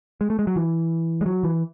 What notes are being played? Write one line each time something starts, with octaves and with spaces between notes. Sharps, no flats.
G#3
A3
G#3
F#3
E3
G#3
F#3
E3